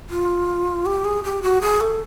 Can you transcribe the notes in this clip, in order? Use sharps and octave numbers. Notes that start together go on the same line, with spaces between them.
F4
G4
G#4
G4
F#4
G#4
A4